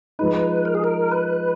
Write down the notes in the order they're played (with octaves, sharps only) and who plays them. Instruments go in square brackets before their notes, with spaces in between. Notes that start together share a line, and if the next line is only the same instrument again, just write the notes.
[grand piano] F3 G#3 D#4 [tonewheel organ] B4
[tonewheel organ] A#4
G#4
A#4
B4